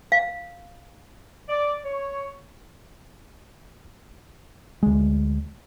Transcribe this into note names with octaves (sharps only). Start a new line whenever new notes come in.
F5
D5
C#5
D2 G#3